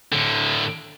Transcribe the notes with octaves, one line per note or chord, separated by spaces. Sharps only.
A2 D3